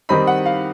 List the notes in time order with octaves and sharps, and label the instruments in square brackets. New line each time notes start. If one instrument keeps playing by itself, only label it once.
[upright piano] D#3 G3 C4 D#4 [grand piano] B5
[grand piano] F#5
F5